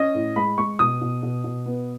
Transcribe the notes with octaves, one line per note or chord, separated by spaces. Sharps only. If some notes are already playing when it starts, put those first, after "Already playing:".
Already playing: C#4 D#5
A2
G#3 B5
G#3 C#6
B2 D#6
B2
B2
B2
B3